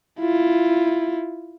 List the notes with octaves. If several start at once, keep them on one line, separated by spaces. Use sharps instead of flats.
E4 F4